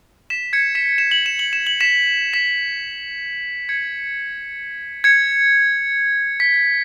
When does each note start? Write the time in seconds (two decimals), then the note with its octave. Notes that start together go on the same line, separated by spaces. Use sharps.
0.30 B6 E7
0.53 G#6 C#7
0.75 B6 E7
0.98 E7
1.11 F#7
1.26 E7
1.39 F#7
1.53 E7
1.67 F#7
1.81 B6 E7
2.33 B6 E7
3.69 G#6 C#7
5.04 G#6 C#7
6.40 B6